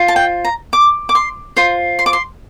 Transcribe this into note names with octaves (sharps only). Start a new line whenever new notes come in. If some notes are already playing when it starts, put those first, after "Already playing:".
Already playing: F4 C5
A5
G5
A#5
D6
D6
C6
F4 C5 C6
C6
D6
C6